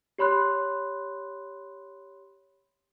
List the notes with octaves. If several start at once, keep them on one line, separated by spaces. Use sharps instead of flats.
G4 C#5 B5 C6 F#6